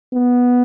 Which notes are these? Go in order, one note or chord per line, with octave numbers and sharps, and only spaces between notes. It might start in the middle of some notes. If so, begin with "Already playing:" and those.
B3